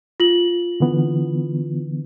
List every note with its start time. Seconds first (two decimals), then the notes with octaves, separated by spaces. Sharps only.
0.20 F4 F#7
0.80 D3 E3 B3